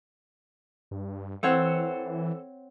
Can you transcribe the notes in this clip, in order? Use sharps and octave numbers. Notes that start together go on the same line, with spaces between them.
G2
E3 C4 A4 C5 C#5 F#5